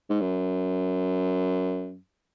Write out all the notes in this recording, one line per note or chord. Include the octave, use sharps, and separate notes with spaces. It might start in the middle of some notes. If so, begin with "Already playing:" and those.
G#2
F#2